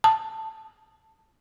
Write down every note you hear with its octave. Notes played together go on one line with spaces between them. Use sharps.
A5